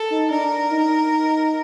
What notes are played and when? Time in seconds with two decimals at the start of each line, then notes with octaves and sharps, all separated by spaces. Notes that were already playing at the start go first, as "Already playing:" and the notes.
Already playing: A4
0.10 D#4
0.30 D4 A#4
0.71 D#4